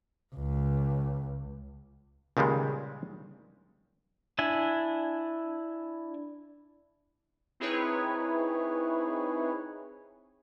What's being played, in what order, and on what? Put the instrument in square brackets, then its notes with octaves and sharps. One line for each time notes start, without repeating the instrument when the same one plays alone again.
[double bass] C#2
[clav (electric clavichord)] C#2 A#2 D#3 G3 G#3
[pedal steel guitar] D4 E4 G#5
[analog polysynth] C4 D#4 E4 G#4 B4 C#5